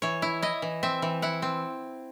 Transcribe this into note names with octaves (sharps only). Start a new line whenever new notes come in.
E3 C#5
E4
E4 D#5
E3
C4 E5
E3
E4 F#5
C4